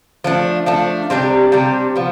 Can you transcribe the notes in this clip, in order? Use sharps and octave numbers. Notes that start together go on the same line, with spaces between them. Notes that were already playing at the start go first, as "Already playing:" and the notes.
F3 A3 D4
F3 A3 D4
C3 G3 D4 G4
C3 G3 D4 G4
F3 B3